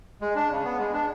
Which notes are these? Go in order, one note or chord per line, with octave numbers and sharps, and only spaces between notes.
G#3
D4
C#3
B3
G#3
D4